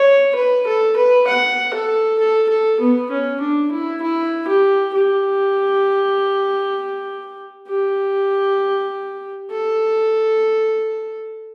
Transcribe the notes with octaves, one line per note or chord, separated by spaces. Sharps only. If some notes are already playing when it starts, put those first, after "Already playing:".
Already playing: C#5
B4
A4
B4
F#5
A4
A4
A4
B3
C#4
D4
E4
E4
G4
G4
G4
A4